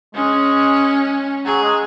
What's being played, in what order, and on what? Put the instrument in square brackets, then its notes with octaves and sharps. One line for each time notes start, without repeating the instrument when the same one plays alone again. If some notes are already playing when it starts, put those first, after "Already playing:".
[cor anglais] G#3 [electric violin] C#4
[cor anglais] F#3 [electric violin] G#4
[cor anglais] G#3